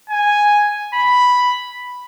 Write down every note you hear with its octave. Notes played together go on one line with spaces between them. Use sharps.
G#5
B5